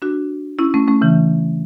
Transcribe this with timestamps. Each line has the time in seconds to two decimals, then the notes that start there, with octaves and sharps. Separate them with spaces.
0.02 D4 F#4
0.59 C#4 E4
0.74 A3 C#4
0.88 A3 C#4
1.02 C#3 E3